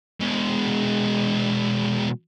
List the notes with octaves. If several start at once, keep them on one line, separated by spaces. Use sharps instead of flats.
B2 G#3